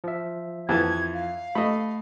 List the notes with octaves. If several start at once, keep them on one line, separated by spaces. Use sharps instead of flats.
F3 E5
F2 E3 A5 G#6
F5
A3 D#5 B5